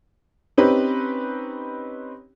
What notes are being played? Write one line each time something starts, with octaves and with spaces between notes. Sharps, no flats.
C4 C#4 D#4 G4 B4